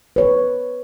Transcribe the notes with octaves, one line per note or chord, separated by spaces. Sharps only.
B4 C#5